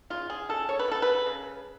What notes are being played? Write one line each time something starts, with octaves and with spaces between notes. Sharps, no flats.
C#3 F4
G#4
C#3 A4
C#5
B4
C#3 A4
B4
C#3